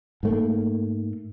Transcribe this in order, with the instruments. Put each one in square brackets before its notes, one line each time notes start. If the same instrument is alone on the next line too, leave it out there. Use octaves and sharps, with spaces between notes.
[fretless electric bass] G#2 A3 A#3